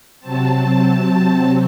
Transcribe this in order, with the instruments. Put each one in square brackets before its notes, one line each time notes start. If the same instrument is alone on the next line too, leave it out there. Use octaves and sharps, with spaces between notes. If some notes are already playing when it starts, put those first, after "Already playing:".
[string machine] C3 F#3 C4 A5